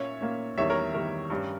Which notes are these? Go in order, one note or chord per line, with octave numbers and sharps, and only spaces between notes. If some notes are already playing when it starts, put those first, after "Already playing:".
Already playing: A#2 A#3 C#4 C#5 E5
A#2 A#3 C#4
E2 D#3 G3 C#5 E5
A#4 C#5
E2 D#3 G3 A#4
G2 G3 C#4